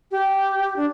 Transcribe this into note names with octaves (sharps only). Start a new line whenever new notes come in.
G4
D4